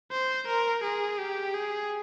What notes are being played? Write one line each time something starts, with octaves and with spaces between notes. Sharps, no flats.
C5
A#4
G#4
G4
G#4